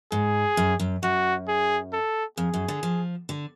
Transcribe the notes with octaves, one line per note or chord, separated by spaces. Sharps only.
G#2 G#4
F#2
F#2
F#2 F#4
G#4
A4
F2 G#4
F#2
D3
F3
D3